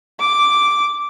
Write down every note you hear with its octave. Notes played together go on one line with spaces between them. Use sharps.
D6